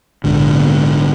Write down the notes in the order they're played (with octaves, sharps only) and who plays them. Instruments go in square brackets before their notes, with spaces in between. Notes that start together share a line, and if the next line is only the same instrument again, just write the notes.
[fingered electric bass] A#1 G#2 D3